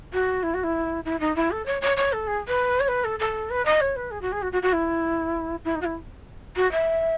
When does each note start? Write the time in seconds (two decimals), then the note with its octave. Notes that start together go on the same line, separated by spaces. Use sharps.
0.13 F#4
0.43 E4
0.54 F#4
0.63 E4
1.05 E4
1.20 D#4
1.36 E4
1.51 A4
1.66 C#5
1.81 C#5
1.97 C#5
2.13 A4
2.27 G#4
2.48 B4
2.80 C#5
2.88 B4
3.04 A4
3.19 A4
3.50 B4
3.66 D#5
3.81 C#5
3.96 B4
4.11 G#4
4.21 F#4
4.32 G#4
4.42 F#4
4.52 F#4
4.62 F#4
4.73 E4
5.64 E4
5.75 D#4
5.81 F#4
5.85 E4
6.56 F#4
6.72 E5